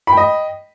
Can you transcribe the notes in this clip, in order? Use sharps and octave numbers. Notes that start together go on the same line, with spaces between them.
D#5 G5 B5